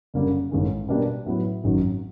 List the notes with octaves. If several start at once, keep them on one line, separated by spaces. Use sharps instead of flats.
F#1 F#2 D3 G3 A#3
A1 G2 D#3 G#3
B2 G3 A#3 D4 G4
A2 F#3 B3 E4
G#1 F#2 D#3 F#3